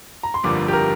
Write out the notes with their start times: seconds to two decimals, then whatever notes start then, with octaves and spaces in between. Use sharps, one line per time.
0.23 A#5
0.34 C6
0.43 G1 F2 D3 F3 A#3 D6
0.68 G4
0.73 A#4